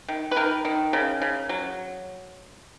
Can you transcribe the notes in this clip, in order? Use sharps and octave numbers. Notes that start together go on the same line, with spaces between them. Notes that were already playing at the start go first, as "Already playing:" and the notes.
D#3
B4
D#3 A#4
D#3
C#3 A#4
C#3
F#3